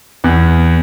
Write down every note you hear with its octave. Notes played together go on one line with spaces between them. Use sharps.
E2